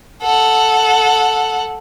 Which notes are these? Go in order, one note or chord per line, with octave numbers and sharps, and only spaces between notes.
A4 F#5